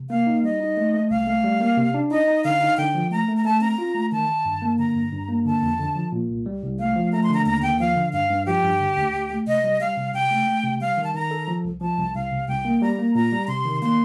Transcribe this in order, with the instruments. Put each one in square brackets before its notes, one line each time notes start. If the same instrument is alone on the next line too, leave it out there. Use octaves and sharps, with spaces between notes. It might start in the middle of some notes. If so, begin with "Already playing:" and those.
Already playing: [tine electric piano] C3
[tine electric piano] A#3 [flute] F5
[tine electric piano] D#4
[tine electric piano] G3 [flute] D#5
[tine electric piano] D#4
A3
A3
[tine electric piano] C2 [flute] F5
[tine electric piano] A3
G3
A#3
C3
D4
[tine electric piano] D#4 [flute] D#5
[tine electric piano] D#4
[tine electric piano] D3 [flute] F5
[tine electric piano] D#4
[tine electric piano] D3 [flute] G5
[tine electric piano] F3
[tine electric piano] A3 [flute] A#5
[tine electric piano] A3
[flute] A#5
[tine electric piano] A3 [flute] A5
[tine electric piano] C4 [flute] A#5
[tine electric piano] F4
A3
[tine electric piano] D#3 [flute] A5
[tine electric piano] D#3
G2
A#3
[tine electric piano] D3 [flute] A#5
[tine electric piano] G2
G2
A#3
[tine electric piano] D3 [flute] A5
[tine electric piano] F2
D3
F3
A#2
C2
G3
C2
[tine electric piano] A3 [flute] F5
[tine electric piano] F3
[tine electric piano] A3 [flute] A#5
[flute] C6
[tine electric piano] D3 [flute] A#5
[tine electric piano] D#2 [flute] A#5
[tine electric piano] D#2 [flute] G5
[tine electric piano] F3 [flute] F5
[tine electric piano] D3
[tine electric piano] G2 [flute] F5
[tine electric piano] G2
[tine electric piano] F3 [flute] G4
[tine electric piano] G2
D3
D2
D2
A3
[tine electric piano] C3 [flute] D#5
[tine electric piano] G3
[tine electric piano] G3 [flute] F5
[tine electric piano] C3
[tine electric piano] C3 [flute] G5
[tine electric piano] A3
A3
C3
[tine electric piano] G3 [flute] F5
[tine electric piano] D#3
[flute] A5
[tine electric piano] D#3 [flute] A#5
[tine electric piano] A4
F3
C2
[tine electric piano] F3 [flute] A5
[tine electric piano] C2
[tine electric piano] C2 [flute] F5
[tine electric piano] C3
[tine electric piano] C2 [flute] G5
[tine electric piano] A#3
[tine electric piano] G3 [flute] A#5
[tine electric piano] A#3
[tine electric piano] A#2 [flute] A#5
[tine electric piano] G3
[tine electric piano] C3 [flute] C6
[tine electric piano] D#3
[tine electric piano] A#3 [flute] C6